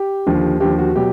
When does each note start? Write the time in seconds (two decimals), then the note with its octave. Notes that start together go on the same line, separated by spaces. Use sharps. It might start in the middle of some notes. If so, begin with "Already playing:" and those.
Already playing: G4
0.26 D#2 D3 F3
0.60 D#2 D3 F3 G4
0.79 F#4
0.95 B2 F#3 G4